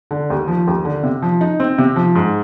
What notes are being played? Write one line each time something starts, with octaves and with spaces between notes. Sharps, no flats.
D3
D#2
F3
D#2
D3
C3
F3
D#4
C4
C3
F3
G#2